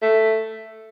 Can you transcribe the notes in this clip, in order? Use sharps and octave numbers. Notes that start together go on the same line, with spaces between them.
A3